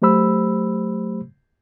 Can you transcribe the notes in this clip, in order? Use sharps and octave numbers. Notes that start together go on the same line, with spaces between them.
F#3 A3 G4 C5 B5 E6